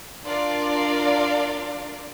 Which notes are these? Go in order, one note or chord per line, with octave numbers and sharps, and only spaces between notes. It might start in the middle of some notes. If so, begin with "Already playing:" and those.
D4 F4 A#4 D5 F5